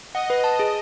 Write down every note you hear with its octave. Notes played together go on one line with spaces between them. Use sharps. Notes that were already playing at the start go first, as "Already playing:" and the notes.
D#5 F#5
B4
A5
G#4